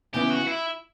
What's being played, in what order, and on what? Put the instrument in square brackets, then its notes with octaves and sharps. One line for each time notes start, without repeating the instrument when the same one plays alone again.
[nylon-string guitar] C#3 E3 B3 E4 [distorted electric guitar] G4
[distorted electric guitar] F#4
E4